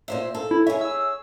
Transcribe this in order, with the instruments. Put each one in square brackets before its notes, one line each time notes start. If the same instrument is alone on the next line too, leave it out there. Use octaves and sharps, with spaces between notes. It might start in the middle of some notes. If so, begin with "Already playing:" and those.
[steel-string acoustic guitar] A#2 C5 E5
A4
[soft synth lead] E4
[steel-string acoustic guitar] G#4 C#5 [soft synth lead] E5
[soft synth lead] E6